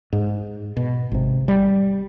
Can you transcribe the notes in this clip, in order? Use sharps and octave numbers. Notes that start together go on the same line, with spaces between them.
G#2
B2
G#1 C3
G3